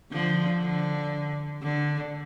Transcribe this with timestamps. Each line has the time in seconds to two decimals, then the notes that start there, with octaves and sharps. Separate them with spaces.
0.12 D3 F3
0.62 D3
1.62 D3